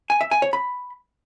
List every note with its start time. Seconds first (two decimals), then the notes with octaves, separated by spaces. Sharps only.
0.10 G#5
0.21 E5
0.31 G#5
0.42 C#5
0.53 B5